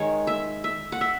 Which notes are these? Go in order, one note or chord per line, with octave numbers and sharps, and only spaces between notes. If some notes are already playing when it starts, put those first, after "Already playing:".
Already playing: D#3 G#3 C#5
E5
E5
F#5
E5